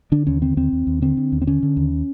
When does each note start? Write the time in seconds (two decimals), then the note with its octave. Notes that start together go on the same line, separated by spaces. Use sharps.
0.12 D3 D4
0.27 D#2 C#4
0.42 D3 C4
0.57 D#2 C4
0.73 D#2
0.87 D#2
1.02 D3 C4
1.17 D3
1.32 D#2
1.42 C4
1.47 D3 C#4
1.63 D3
1.77 D#2